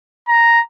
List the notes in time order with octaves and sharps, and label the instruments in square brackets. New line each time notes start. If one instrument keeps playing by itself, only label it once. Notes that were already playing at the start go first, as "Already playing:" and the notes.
[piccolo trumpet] A#5